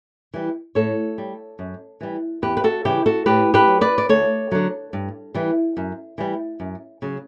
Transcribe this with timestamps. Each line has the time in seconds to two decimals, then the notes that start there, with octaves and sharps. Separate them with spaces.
0.34 E3 G3
0.75 A2 A4 C#5
1.18 G3
1.59 F#2
2.01 E3 G3
2.42 E2 G4 B4
2.57 B4
2.64 F#4 A4
2.85 C#3 E3 G3 E4 G4
3.06 F#4 A4
3.26 A2 G4 B4
3.54 G4 B4
3.67 F#3
3.81 B4 D5
3.98 D5
4.09 D2 A4 C#5
4.52 D3 F#3
4.93 G2
5.35 E3 G3
5.77 F#2
6.18 E3 G3
6.60 F#2
7.02 C#3 F#3